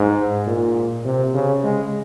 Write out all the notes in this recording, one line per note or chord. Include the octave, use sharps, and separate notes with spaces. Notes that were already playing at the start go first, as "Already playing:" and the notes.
Already playing: G#2
A#2
C3
C#3
G#3